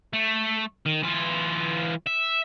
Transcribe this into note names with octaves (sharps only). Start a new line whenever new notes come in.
A3
D#3
E3 F4
E5